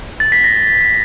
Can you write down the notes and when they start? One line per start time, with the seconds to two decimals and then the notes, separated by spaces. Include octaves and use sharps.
0.20 A6
0.32 B6
0.44 A#6